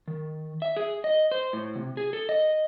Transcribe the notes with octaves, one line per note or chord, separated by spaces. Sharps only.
D#3
E5
G#4
D#5
C5
A2
C3
G#4
A4
D#5